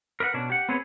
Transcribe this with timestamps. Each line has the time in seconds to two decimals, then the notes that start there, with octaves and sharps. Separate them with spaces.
0.20 A#4 B4 D#5 F#5
0.34 B2 C#4 D4
0.50 G4 F#5
0.69 B3 C4 G#4 B4 C#5